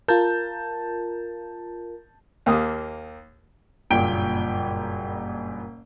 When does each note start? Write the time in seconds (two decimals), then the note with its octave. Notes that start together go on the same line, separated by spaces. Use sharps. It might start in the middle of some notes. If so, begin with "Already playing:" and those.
0.08 F4 A#4 A5 G6
2.46 D#2 A#3 D#6
3.91 F#1 G2 A#2 G5 D7